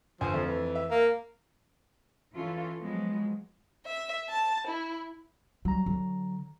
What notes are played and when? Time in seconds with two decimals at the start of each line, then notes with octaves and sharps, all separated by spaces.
0.21 G1 F3 C5 G#5
0.34 F2 A3
0.46 E3
0.75 E5
0.90 A#3
2.35 E3 C#4 F4 A4
2.81 F3 F#3 G#3 B3
3.86 E5
4.29 A5
4.67 E4
5.65 F#3 G3 A#5
5.86 D3